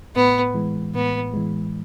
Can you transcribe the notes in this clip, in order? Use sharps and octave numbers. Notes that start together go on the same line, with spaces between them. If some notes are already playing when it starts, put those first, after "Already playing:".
A2 B3
E3 G#3
A2 B3
E3 G#3